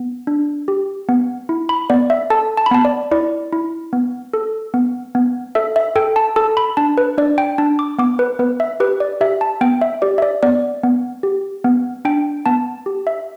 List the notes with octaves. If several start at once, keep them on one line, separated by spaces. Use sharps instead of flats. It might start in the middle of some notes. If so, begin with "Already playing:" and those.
Already playing: B3
D4
G4
B3
E4
B5
B3 D5
E5
A4 A5
A5
B5
B3 A5
D5
E4 D5
E4
B3
A4
B3
B3
A4 E5
E5
A4 G5
A5
A4 A5
B5
D4 A5
B4
D4 D5
G5
D4 A5
D6
B3 D6
B4
B3 B4
E5
G4 B4
D5
G4 E5
A5
B3 G5
E5
G4 D5
E5
D5
B3 D5
B3
G4
B3
D4 G5
B3 A5
G4
E5